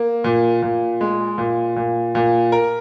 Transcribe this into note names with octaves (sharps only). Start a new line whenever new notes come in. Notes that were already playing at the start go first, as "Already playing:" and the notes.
Already playing: A#3
A#2
A#2
G#3
A#2
A#2
A#2
A#4